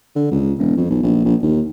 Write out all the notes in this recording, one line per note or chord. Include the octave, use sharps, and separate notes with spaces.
D3
C#2
E1
F2
B1
A#1
A#1
D#2